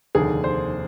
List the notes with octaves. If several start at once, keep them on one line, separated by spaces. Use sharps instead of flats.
F1 D#2 D3 G#4
C5